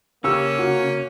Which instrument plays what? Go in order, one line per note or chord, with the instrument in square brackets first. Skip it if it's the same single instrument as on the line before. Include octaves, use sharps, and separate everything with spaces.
[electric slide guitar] C#3 [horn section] A#3 C#4 [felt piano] G4 E6
[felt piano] F#4